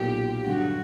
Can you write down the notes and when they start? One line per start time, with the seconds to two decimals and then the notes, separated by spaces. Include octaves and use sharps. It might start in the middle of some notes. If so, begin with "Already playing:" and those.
Already playing: B1 A#2 F#3 B3 G4
0.45 G2 D3 F#3 F#4